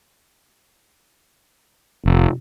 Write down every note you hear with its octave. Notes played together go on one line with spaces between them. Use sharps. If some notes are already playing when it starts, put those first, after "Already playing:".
F1